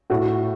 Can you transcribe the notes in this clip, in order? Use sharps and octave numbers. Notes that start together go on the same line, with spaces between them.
A2 F#4